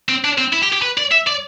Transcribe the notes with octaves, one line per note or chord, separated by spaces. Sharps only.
C4
D4
C4
E4
G4
G4
B4
D5
E5
D5